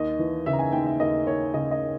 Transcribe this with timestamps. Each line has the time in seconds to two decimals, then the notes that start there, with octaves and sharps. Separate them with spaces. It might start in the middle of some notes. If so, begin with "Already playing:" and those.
Already playing: D#2 D#5
0.19 E3
0.46 C#3 E5
0.53 A#5
0.59 G#5
0.72 D#2 G5
0.87 E5
1.00 D#2 D#5
1.27 D#2 C#5
1.54 C#3 D#5
1.71 D#5